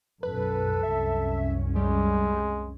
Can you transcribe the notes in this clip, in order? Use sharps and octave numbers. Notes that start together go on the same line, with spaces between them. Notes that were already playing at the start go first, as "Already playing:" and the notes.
B1 F#2 A4 B4
C2 F#2 C#4 E5
G3 G#3